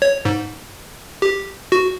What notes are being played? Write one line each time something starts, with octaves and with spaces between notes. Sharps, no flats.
C#5
G#2
G4
F#4